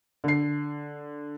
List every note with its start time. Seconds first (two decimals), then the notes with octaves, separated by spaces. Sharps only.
0.24 D3 C7